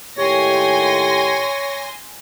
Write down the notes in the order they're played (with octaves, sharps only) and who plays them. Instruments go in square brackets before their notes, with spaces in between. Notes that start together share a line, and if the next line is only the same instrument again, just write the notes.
[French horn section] D#2 A2 G4 [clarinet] C#5 [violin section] G#5 C6 A#6